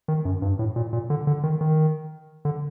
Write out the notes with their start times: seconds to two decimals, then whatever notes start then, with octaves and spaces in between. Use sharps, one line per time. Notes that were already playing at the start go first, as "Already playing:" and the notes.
0.08 D#3
0.25 F#2
0.42 G2
0.59 A2
0.76 A#2
0.93 A#2
1.10 D3
1.27 D3
1.43 D#3
1.61 D#3
2.45 D3